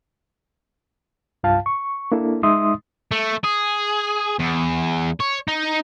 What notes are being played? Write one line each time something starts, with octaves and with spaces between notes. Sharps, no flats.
C2 G2 F4 F5 A5
C#6
A#3 D4 E4 A4
G#3 D#4 E5 C6 D#6
A3
G#4
E2
C#5
D#4